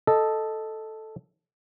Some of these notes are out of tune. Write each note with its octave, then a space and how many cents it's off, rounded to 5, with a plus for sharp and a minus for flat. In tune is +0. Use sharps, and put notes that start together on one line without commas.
A4 +0 D#5 +0